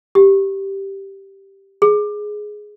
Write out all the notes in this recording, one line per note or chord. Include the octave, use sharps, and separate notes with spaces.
G4
G#4